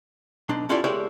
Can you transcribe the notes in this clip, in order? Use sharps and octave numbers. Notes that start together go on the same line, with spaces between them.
B1 D4 D#4 C6
C#4 E4 F4 G4 A4 D5
G#3 A#3 G4 C#5 D5 E5